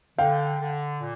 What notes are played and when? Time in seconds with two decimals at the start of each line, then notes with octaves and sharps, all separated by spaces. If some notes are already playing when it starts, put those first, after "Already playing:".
0.18 D3 F5 G5
0.59 D3
1.00 A#2